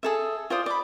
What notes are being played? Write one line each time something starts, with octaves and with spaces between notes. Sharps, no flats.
G#4 A4 E5
F4 C5 D5 D#6
D5 B5